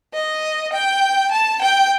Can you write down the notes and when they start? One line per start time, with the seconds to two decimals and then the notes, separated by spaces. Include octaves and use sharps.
0.14 D#5
0.73 G5
1.31 A5
1.62 G5